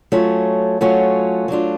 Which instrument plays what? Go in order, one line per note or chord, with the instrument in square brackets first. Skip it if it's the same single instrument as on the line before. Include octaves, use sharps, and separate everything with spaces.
[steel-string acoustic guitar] F#3 A3 C#4 F4
F#3 A3 C#4 F4
F#3 A3 D4 F4